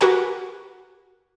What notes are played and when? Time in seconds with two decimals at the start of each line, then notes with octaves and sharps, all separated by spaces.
0.01 F#4 G4 A#4 B4 F#5 G#5